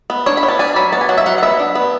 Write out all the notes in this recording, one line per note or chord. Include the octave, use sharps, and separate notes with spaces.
B3
D4 C#5
B5
B3
A5
D4 G#5
F#3 B5
B3 A5
G#5
F#3 F#5
E5
F#3 F#5
F#5
B3 E5
D4
B3